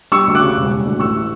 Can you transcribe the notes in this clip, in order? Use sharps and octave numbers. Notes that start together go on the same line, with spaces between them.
G3 C#6 E6
D2
D6 F#6
C#3
E1
G3
D2
A1 C#6 E6